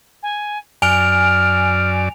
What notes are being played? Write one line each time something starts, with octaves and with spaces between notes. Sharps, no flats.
G#5
F#2 D5 G#5 F6 D7 F7